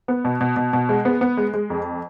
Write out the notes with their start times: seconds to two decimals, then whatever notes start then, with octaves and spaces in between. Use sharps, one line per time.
0.08 B3
0.25 B2
0.41 B2
0.56 B2
0.73 B2
0.89 G#3
1.05 B3
1.21 B3
1.37 G#3
1.54 G#3
1.70 F2